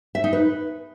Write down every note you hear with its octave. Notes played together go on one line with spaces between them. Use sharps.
E5
D#4
B4